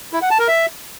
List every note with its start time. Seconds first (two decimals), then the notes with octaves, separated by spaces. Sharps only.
0.13 E4
0.22 F#5
0.31 A5
0.39 A#4
0.48 E5